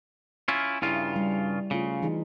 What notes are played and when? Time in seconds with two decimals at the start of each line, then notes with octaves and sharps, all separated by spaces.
0.48 C#4 E4 F4
0.82 G2 C#3 E4 F4
1.16 G3
1.71 C#3 A3 F4
2.02 E3 D#4 G#4